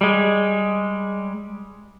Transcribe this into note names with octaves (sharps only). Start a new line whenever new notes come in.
G3 G#3